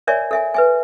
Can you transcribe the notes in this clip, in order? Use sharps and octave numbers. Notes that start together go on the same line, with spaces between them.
A#4 C#5 D5 E5 G#5
A4 E5 G#5
B4 E5 G#5